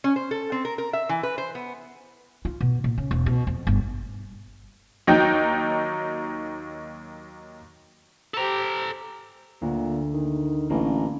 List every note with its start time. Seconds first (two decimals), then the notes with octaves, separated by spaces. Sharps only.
0.04 C#4
0.16 C5
0.31 A4
0.52 C4
0.65 A#4
0.78 A#4
0.93 E5
1.09 E3
1.23 B4
1.38 C5
1.55 B3
2.45 F4
2.61 B2
2.84 A#2
2.98 C#3
3.11 E1
3.26 B2
3.47 F2
3.67 G1
5.07 D#2 F#3 D#4 G5
8.34 G4 A4 C5 A#5
9.62 D2 A#2
10.13 D#3
10.70 A1 A#3 C#4